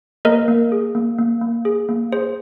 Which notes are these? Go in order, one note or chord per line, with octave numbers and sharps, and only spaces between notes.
A#3 A#4 D#5
A#3
G#4
A#3
A#3
A#3
G#4
A#3
G#4 C5